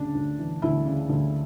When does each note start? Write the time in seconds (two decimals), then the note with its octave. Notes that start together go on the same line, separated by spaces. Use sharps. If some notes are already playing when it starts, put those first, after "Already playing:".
Already playing: D2 C#3 D4
0.15 D2
0.39 E3
0.62 D2 E4
0.86 C#3
1.09 D2